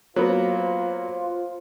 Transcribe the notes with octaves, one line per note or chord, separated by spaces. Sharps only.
F#3 A#3 B3 F4 C5